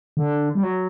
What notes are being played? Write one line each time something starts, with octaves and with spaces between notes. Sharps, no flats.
D3
G3
F#3